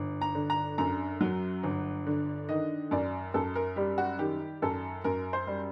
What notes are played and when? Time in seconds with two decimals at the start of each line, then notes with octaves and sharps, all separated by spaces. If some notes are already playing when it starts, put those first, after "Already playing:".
Already playing: G1
0.21 A#5
0.35 D3
0.50 A#5
0.78 F#2 A#5
1.21 F#3
1.63 G1
2.07 D3
2.49 D#3 D#5
2.91 F#2 D5
3.34 F#2 A4
3.55 A#4
3.76 G3 G4
3.98 F#4
4.19 D#3 G4
4.62 F#2 A4
5.04 F#2 A#4
5.33 C5
5.47 G3